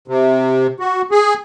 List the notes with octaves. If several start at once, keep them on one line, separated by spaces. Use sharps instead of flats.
C3
F#4
G#4